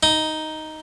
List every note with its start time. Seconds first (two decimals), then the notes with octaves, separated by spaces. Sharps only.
0.03 D#4